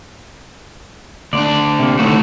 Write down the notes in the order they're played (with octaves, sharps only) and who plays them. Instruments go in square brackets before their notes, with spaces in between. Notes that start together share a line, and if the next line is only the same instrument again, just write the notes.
[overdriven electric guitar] D2 D4 [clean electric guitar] D5
[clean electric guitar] C3 A#3
[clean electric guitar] D3 D#3 F#4 [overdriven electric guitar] A3 C#5